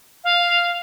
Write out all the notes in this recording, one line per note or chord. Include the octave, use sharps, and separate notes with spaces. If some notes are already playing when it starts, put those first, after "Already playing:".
F5